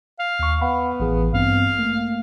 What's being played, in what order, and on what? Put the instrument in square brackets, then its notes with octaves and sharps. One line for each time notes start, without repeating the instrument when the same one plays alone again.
[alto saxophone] F5
[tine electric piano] D#2 C#6
[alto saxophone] B3 [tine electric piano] F5 F#5 B5
[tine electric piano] A1 E3 G#4
[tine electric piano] G2 B3 C4 [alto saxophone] F5
[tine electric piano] A3 A#3